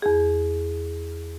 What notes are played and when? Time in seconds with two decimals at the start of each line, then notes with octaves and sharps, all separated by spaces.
0.02 E2 G#4